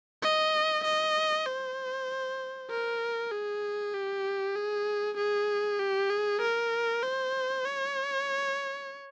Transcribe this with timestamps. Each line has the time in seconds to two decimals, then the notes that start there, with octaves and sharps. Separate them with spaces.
0.22 D#5
0.85 D#5
1.46 C5
2.70 A#4
3.32 G#4
3.94 G4
4.56 G#4
5.18 G#4
5.80 G4
6.11 G#4
6.42 A#4
7.04 C5
7.66 C#5